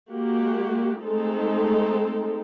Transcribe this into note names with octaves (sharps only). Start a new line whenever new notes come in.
G#3 A#3 F#4 G4
G#3 A3 C4 D#4 A4